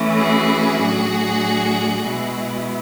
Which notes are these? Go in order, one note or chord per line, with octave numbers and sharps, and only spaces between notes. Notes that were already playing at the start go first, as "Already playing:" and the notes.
Already playing: E3 A3 C#4 E4
F#4 G#4
A2 F#3 A3 D4
B2 G#3 B3 E4